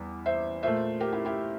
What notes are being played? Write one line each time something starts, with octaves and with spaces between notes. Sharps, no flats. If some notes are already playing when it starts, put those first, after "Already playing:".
Already playing: E2 G3
C5 E5
A#2 A3 C5 E5
G4 A#4
E4 G4
E4 G4